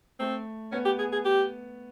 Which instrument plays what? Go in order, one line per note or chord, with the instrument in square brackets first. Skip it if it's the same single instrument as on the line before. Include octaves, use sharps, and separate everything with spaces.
[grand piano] A3 [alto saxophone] C4
[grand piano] B3 [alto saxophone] C#4
[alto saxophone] G4
G#4
G#4
G4